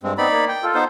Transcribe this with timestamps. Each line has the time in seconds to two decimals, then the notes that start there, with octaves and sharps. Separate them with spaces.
0.03 G2 G#3 C4
0.18 B3 C4 D#4 D5 B5
0.31 A#3
0.49 G5
0.63 F4 A4
0.75 B3 D#4 C5